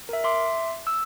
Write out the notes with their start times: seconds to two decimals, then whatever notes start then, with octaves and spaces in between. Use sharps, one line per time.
0.09 A#4 E5
0.24 E5 C6 D6
0.87 E6